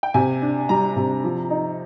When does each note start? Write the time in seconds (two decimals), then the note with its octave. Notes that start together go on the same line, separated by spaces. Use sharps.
0.03 G5
0.14 C3 G#5
0.42 D4
0.69 G3 A#5
0.96 C3
1.24 F3
1.50 D#4